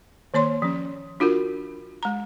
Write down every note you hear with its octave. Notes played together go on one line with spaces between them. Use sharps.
D#3 A#3 C#5 C6
F3 C#4
D4 F4 F#4 A#4
G#3 A#5